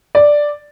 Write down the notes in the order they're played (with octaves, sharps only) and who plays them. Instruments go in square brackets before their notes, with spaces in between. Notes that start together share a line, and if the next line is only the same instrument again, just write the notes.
[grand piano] D5